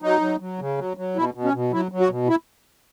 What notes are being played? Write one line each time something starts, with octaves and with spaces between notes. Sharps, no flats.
F#3 D#4
F#3
F#3
C#3
F#3
F#3
B2 E4
B2
C#4
B2
F#3 E4
F#3
F#4
B2
E4